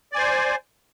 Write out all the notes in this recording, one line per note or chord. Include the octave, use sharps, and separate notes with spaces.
C5 D5 G#5